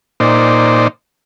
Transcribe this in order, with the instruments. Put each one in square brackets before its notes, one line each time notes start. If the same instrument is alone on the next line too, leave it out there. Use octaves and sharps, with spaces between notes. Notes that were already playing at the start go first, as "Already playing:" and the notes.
[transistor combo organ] A#2 D#4 C5 D5